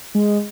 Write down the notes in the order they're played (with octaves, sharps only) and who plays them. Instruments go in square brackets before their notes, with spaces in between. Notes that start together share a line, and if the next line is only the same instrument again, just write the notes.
[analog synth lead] G#3